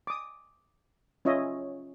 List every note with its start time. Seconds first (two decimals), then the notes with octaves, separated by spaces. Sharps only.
0.07 D6 D#6
1.25 C#4 F4 C#5 D#5 E5